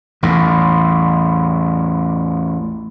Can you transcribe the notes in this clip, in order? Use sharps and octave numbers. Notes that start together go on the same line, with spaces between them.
A1 E2 A2